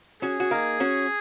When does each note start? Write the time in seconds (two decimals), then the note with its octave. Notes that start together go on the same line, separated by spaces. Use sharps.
0.22 C#4 F#4 G#4
0.40 F#4
0.51 A#3 D#4
0.80 C#4 F#4